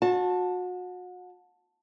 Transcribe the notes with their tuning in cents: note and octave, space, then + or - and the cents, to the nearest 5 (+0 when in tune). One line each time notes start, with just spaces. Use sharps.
F#4 -35 A5 +0